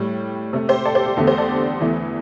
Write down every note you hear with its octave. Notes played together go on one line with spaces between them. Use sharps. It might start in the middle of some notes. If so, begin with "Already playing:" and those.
Already playing: A2 G3
C3 A3
G4 C5
A4 D5
G4 C5
G4
E2 D3 A3 A4
G4 C5
A4 D5
E2 E3 A3